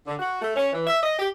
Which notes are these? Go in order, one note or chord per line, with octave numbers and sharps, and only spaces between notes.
D3
F#4
A3
C#4
E3
E5
D#5
G4